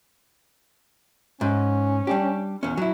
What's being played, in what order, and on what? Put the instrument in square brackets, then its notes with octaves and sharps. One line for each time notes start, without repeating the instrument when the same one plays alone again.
[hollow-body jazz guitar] G#2 [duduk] C#4
[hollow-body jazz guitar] G3 D4 G4
E2 C#4
F#3 E4